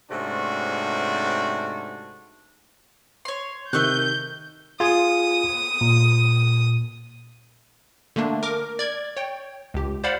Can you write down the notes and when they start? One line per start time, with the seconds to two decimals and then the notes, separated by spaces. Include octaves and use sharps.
0.11 G#2 C3 A3 C#4 D4 F#4
3.25 C#5 C6
3.73 C3 D#3 A3 C#6 F#6 G6
4.80 F4 G#4 G#5 D#6
5.81 A#2
8.16 D3 A3 A#3 D4
8.43 A#4 D6
8.79 D5 G#6
9.17 C#5 G5
9.74 C#2 G4
10.04 C5 D5 F5 F#5 B5